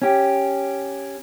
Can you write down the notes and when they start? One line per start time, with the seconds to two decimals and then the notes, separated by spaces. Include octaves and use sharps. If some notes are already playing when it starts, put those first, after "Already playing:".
0.02 C#4 G4